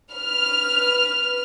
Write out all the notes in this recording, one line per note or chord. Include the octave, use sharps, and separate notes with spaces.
B4 F6